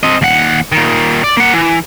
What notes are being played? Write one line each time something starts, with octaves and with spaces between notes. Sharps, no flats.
C4 D#5
D#2 F#5
A#2 D#3
D5
A#3 F#5
E3